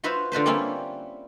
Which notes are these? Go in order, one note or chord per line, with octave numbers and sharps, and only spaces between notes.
F4 F#4 B4 C5 E5
D3 F4 B4 C5
G3 A#3 C4 C#4 E4 F4